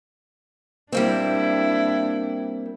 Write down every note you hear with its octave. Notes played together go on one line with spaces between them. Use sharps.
G3 A#3 C4 D4 E4